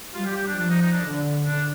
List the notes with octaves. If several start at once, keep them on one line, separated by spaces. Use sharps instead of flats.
G3 F4
G4
G4
D4
F3 D4
D#4
D#4
D4
D3
D4